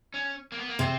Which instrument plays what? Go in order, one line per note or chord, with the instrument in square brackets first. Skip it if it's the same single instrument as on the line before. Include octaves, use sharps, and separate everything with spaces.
[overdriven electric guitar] C#4
A#3
B3
A#3
[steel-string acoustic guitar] C3 [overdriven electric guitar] C4